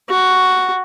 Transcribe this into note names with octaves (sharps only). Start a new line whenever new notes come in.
F#4